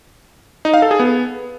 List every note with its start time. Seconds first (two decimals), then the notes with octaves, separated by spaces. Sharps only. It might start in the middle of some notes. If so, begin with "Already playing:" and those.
0.65 D#4
0.74 F5
0.82 A4
0.91 G#4
0.99 B3